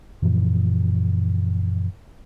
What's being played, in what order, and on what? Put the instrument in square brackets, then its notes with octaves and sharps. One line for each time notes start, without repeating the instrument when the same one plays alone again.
[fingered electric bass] F#2 A#2 E3 F3